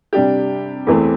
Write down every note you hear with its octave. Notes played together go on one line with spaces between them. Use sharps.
C3 G3 D4 G4
E2 E3 A3 C4